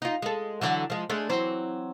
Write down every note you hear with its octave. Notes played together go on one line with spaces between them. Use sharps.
D#4 F4
G#3 A4
D3 E3 F#3
F3 G#3
G#3 A3 D4
E3 F#3 C4